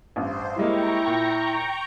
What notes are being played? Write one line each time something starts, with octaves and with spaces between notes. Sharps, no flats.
A1 G2 C5
G3 G#3 A#3 E4 G5 A#5 C#6
A#2